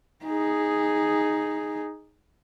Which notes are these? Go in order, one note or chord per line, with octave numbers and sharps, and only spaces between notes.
D#4 G#4